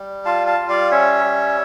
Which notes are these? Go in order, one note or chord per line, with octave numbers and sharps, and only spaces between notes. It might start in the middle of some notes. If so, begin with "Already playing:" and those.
Already playing: G3
F4 F5 A5
F5 A5
G3
D5 F5
C#4 C#5 E5
G3